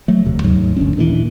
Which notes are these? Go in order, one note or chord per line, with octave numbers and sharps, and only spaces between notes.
F#3 A3
E1 D2 C3
D#2 G#2 F#3
G1 D2 C#4 D4
D#2 A#2 D#3 E3